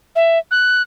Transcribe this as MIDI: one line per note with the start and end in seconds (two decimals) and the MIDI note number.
0.16 0.39 76
0.51 0.82 90